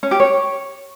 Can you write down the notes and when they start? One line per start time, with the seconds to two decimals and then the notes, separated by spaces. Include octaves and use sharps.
0.03 C#4
0.11 G4
0.20 C#5